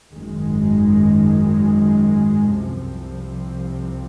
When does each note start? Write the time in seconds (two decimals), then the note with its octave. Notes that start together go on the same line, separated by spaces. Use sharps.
0.14 G#1 F#2 D#3 G#3
2.57 C2 C3 F3